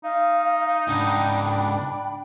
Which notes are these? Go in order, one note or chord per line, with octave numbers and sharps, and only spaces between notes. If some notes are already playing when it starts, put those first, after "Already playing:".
D#4 F5
C#2 G#2 D4 G5 B5